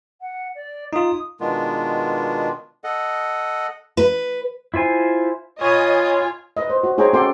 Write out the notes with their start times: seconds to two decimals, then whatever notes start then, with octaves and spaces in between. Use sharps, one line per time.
0.21 F#5
0.55 D5
0.93 D#4 F4 D#6
1.40 B2 D#3 G#3 B3 D4 F4
2.84 A4 D#5 F#5
3.97 B4
4.74 E4 F4 C5 G#5
5.61 F4 C#5 D#5 G#5 B5 D#6
6.57 B4 D#5
6.70 C5
6.83 F#4
6.98 D#4 G#4 C5 C#5 G5 A#5
7.13 C#4 F#4 A4 D5 G5 C6